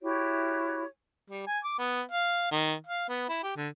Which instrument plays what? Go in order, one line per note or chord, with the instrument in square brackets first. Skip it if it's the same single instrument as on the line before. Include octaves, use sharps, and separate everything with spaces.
[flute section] E4 F#4 G4 C#5
[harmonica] G3
G#5
D6
B3
F5
D#3
F5
B3
E4
G4
D3